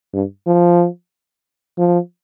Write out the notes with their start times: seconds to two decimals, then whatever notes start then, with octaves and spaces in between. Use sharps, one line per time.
0.13 G2
0.47 F3
1.78 F3